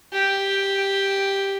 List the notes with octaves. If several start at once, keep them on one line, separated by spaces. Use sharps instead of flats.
G4